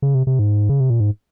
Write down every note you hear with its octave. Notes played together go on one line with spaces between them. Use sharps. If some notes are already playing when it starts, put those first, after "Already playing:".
C#3
C3
C3
G#2
C#3
C3
A#2
G#2